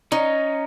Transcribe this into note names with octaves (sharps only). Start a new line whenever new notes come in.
C#4 D#4